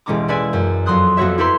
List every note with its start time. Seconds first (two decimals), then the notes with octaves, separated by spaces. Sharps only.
0.06 E1 A1 G#3 C#4 A#5 D6
0.28 C#4 E4 B4 D5 E5 G#5
0.53 F#2
0.86 F2 F#3 C6 D#6 F#6
1.17 F2 B3 F#4 C#5 E5
1.38 E4 G4 A4 B4 A#5 C6